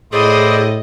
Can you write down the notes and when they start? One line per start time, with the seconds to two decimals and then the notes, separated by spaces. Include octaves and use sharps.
0.12 A2 E4 G#4 C5 D5 D#5